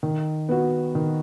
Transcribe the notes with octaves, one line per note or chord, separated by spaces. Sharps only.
D#3
B3 F#4
D#3